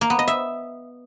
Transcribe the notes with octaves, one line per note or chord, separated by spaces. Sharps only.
A#3
B3
D#5
E5